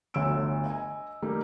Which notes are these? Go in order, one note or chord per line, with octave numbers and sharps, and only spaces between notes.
G1 D2 D3 C#5 E6 D7
D#5 G#5
D#3 G3 A3 A#3 D#4